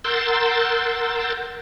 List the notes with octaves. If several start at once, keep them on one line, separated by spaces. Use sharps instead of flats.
A#4 F#5 C6 E6 G6 A6